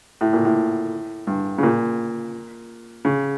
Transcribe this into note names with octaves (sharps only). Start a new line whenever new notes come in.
A2
A#2
A2
G2
C#3
A#2
C#3